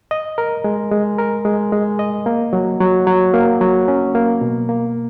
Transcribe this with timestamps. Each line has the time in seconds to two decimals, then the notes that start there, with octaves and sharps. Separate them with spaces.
0.11 D#5
0.38 A#4
0.64 G#3
0.91 G#3
1.19 A#4
1.45 G#3
1.72 G#3
1.99 D#5
2.26 A#3
2.53 F#3
2.80 F#3
3.07 F#3
3.34 A#3
3.61 F#3
3.88 C#4
4.15 A#3
4.41 B2
4.69 A#3